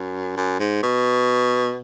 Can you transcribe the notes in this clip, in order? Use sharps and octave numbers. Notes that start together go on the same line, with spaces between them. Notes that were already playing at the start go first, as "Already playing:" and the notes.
Already playing: F#2
F#2
G#2
B2